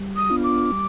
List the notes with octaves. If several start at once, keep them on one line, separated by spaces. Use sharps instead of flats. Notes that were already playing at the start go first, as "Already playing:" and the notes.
Already playing: G3
D#6
B3 D4 F4
D6
G3